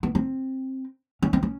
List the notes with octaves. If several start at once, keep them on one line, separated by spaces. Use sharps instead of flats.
B3
C4
C#4
C4
C#4